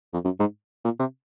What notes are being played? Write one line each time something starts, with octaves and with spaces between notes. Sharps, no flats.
F2
F#2
G#2
A#2
C3